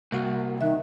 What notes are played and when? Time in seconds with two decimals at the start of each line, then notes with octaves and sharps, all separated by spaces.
0.12 C2 A#3 F#4
0.61 D#3 E5 F#6